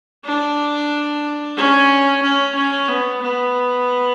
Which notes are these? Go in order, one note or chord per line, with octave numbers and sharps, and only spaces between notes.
D4
C#4
C#4
C#4
B3
B3